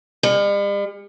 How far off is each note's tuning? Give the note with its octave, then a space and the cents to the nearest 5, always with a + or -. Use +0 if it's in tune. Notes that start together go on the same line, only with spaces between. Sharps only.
G3 +45